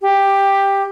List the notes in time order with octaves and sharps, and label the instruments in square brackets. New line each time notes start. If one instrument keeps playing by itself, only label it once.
[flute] G4